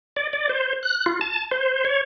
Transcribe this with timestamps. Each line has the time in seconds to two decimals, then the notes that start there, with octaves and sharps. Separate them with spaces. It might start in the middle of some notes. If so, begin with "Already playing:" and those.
0.16 D5
0.33 D5
0.49 C5
0.83 F#6
1.06 F4
1.21 A5
1.51 C5
1.85 C#5